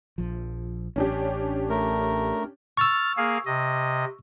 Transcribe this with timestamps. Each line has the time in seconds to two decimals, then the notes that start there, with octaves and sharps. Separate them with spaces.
0.18 A#1 F3
0.96 A1 C#4 D4 G4
1.69 A3 A#4
2.77 C#6 E6 F6 A6
3.17 A#3 G#4 F5
3.46 C3 D#5